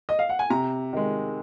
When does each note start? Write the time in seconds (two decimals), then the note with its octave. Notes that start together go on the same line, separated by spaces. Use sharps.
0.09 D#5
0.19 F5
0.29 F#5
0.39 G#5
0.50 C3 A#5
0.93 D#3 G#3